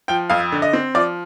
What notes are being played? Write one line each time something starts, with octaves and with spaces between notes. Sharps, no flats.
F3 G5
F2 F5
D3
D#5
C4
F3 D5